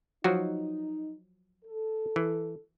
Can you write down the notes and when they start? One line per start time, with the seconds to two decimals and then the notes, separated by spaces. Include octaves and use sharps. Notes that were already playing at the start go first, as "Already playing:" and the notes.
0.24 F3 F#3 D#4 F#4
1.64 A4
2.16 E3